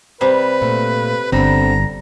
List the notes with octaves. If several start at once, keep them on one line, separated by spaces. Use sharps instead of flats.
C3 G3 C4 B4
A#2 A3
G1 D3 G3 C4 A#5